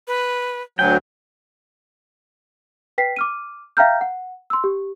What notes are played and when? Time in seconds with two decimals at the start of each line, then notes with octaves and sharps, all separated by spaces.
0.07 B4
0.79 D2 F#3 G5 G#5
2.98 B4 G5 B6 C7
3.16 D6 F6 D#7
3.77 E5 F5 G5 A#5 F6 G6
4.01 F#5
4.50 C6 E6
4.64 G4